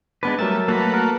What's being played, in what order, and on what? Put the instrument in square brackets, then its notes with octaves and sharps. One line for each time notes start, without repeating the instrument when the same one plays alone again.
[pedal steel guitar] G#3 B3 B4 [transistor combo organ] D4 A5
[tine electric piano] F#3 A#4 A6 [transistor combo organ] G3 A3 [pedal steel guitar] E5
[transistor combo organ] A3 A4 F#5 [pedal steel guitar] A#3 F#4 B4
[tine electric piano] A#4